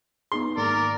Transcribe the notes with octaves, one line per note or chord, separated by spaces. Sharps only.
B3 D#4 G#4 C6
G#2 D#3 A#3 A#4 D5